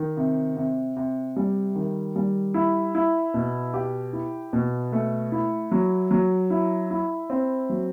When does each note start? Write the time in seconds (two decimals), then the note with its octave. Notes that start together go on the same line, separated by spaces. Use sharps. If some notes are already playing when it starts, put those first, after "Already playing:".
Already playing: D#3
0.17 C3
0.57 C3
0.96 C3
1.36 G3
1.75 D#3
2.16 G3
2.54 E4
2.95 E4
3.34 B2
3.74 G4
4.13 E4
4.53 B2
4.92 A3
5.32 E4
5.72 F#3
6.11 F#3
6.50 E4
6.91 E4
7.30 C4
7.70 F#3